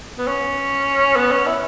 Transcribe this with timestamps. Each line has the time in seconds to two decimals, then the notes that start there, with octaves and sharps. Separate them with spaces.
0.18 B3
0.27 C#4
1.16 B3
1.32 C#4
1.46 E4